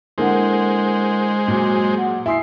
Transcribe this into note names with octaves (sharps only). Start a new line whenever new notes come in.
D3 G#3 A#3 E4 A#4 C5 F#5
A#2 F#3 F#4
F#5
E4 E5 G#5 C6 D#6 C7